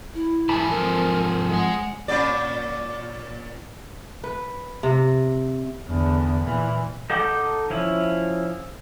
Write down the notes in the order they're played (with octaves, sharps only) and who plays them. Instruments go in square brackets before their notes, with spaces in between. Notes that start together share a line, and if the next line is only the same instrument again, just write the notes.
[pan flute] E4
[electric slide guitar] G#2 A4 G#5 [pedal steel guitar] E3 A5 B5
[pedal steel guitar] F3 C4 [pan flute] A#4
[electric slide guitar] G#3 G#5 [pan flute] F#5
[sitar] A#2 C#4 D5
[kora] B4
C3
[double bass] E2 D3
A#2 E3
[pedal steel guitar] D#4 A4 F#5 D6 G6
F3 C#4 E4